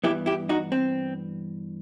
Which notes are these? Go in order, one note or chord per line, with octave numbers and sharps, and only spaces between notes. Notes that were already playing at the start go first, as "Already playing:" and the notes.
G2 E3 B3 E4 G4
E4 G4
D#4 F#4
C4